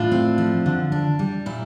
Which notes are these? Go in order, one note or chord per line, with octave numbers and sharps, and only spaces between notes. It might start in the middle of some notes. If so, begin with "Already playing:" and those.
Already playing: A2 D4 F4
C4
F3
D3
D4
G3
A#2 E4